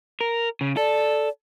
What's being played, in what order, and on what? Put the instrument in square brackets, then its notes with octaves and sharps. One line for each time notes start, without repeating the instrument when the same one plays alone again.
[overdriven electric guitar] A#4
C#3
[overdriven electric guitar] A4 [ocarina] D5